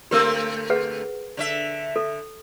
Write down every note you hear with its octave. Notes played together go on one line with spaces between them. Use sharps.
D3 A3 C4 G4 A#4 E6
G#4 B4 F#5
D3 C#5 E5
A4